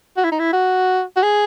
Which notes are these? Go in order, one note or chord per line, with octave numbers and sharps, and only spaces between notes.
F#4
E4
D#4
E4
F#4
F#4
G#4